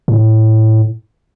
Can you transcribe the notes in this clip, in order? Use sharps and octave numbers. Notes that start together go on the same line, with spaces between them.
A2